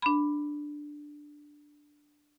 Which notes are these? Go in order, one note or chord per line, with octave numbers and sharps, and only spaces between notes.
D4 B5